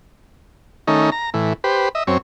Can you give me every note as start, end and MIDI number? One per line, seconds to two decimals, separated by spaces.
0.87 1.10 51
0.87 1.10 57
0.87 1.10 61
0.87 1.10 63
1.12 1.30 82
1.34 1.53 45
1.34 1.53 52
1.64 1.89 67
1.64 1.89 71
1.64 1.89 72
1.95 2.03 75
1.95 2.03 76
2.07 2.18 42
2.07 2.18 60
2.07 2.18 73